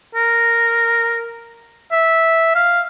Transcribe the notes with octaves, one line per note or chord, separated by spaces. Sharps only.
A#4
E5
F5